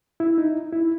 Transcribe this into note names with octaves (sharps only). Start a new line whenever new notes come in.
E4
D#4
E4